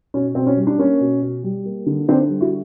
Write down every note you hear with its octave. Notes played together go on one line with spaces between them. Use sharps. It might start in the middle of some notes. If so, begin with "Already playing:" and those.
B2 C#4
B2 C4
C#4
G3
D4
A#3 C#4
B2
B2
G3
A#3
D3
D3 C4 D4
G3
E4 F#4